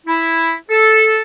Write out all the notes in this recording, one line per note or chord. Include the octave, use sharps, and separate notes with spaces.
E4
A4